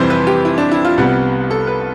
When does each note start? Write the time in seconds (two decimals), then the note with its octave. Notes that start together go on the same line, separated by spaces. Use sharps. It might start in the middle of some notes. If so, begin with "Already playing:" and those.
Already playing: F2 C3 E3 G3 C5
0.10 B4
0.27 G4
0.45 E4
0.58 D4
0.71 E4
0.85 F4
0.98 C2 C3 G3 B3
1.51 A4
1.67 B4